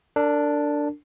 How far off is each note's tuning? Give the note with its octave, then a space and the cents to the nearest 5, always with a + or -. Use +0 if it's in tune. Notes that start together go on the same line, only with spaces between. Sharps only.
D4 +0 A#4 -45